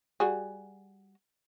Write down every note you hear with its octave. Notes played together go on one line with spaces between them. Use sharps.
G3 F#4 G#4